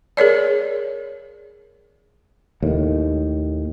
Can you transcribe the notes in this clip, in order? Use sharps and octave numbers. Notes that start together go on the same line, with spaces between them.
G#4 A#4 C#5 D5
D#2 A2